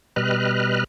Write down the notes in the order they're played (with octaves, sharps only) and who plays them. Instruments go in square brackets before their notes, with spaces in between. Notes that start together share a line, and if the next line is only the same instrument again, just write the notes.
[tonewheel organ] B2 G3 B4 D#5 F6 F#6